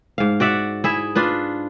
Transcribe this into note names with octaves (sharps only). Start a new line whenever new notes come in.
G#2 F5
F#4 D5 E5 F#5
E4 G#4 E5
D4 F4 B4